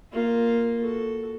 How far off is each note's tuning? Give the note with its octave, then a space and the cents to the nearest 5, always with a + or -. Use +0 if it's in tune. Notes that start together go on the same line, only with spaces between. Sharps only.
A#3 +0 F4 +0
F#4 +0 A4 +0